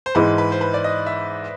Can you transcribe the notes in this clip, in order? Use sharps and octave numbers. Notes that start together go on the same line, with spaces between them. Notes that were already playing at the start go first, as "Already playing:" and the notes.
C5
G#2 E3 G#3 B4
B4
C5
B4
D5
D#5
E5